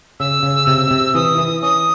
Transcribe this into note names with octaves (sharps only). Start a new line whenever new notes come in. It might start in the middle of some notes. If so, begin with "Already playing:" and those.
C#3 E6
C#3
C3
C3
E3 D#6
E3
C#4 D#6